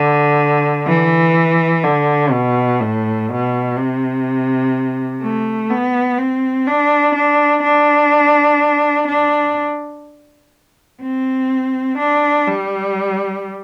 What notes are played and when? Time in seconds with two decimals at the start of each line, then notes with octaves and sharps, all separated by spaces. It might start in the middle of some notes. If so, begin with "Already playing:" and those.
Already playing: D3
0.87 E3
1.84 D3
2.32 B2
2.81 A2
3.29 B2
3.77 C3
5.22 A3
5.70 B3
6.18 C4
6.67 D4
7.15 D4
7.63 D4
9.08 D4
11.02 C4
11.99 D4
12.47 G3